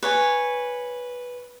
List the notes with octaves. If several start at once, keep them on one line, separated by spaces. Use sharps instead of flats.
B4 C#5 G#5